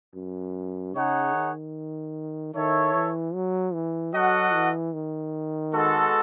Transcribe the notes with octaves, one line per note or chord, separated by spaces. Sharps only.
F#2
C#3 D#4 G#4 C#5 F#5
D#3
D#3 E4 A4 C#5 E5
E3
F#3
E3
F#3 F#4 A4 D#5 F#5
E3
D#3
G#3 B3 F#4 A4